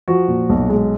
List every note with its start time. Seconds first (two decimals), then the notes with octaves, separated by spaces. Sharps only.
0.08 F3 F#4
0.28 A#2
0.49 B1
0.70 G#3